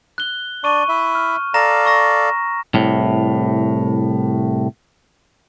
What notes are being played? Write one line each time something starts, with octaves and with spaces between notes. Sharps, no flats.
F#6 G7
D4 D5 C#6 D#7
E4 E5
F6
A4 D5 F5 A#5 A#6 E7
C#6 E6 A#6
C2 A2